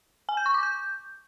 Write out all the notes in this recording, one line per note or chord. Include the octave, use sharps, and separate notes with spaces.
G#5
G6
C#6
D6
G6